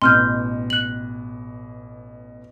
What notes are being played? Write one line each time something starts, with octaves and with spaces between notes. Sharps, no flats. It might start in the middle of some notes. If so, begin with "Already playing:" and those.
A1 B2 C6 F6 G6
F#6 F#7